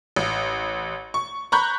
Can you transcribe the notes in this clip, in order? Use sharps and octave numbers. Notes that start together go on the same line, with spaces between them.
A1
C#6
A#5 B5 C#6 F#6 G6